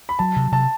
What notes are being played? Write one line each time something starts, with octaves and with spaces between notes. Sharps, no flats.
B5
F#3 A5
C3
C3 A5